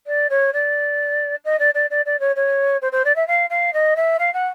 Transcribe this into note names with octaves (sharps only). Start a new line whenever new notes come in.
D5
C#5
D5
D#5
D5
D5
D5
D5
C#5
C#5
C5
C5
D5
E5
F5
F5
D#5
E5
F5
F#5